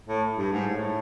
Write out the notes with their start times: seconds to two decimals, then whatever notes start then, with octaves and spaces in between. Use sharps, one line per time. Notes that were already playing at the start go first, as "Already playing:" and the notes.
0.08 A2
0.37 G2
0.52 G#2
0.67 A2